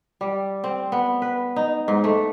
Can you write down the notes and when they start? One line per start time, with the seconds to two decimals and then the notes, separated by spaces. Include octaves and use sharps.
0.21 G3
0.64 C4
0.92 B3
1.22 B4
1.56 D#4
1.88 G#2
2.04 A3